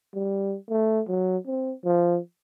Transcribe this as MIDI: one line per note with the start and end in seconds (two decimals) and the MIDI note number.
0.15 0.56 55
0.70 1.01 57
1.08 1.37 54
1.47 1.74 60
1.85 2.19 53